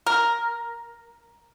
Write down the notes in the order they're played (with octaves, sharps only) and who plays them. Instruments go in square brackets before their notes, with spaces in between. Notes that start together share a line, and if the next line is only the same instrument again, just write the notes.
[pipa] A#4